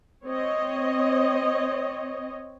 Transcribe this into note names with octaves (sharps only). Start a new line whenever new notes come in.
C4 C#5 D#5